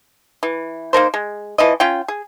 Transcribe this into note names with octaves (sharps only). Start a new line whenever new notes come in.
E3
A#3 D#4 A#4 C5
G#3
E3 F3 D#5
C#4 F4 G5
G#4